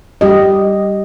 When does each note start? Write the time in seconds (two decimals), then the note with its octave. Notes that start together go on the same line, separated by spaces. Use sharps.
0.21 G3 G4 D#5